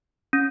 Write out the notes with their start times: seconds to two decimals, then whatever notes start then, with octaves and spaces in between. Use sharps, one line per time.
0.33 C#4